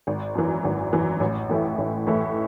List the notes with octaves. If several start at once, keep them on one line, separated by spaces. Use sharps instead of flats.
G#1
F#2 E3
G#1
F#2 E3
A1
A2 E3 A3 E4
A1
A2 E3 A3 E4